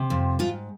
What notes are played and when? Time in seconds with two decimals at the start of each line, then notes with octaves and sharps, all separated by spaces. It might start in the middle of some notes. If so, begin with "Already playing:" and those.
Already playing: C3
0.10 F2
0.39 G#2 F4